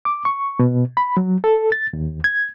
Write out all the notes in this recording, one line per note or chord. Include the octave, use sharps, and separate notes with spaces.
D6
C#6
B2
B5
F#3
A4
A6
D#2
G#6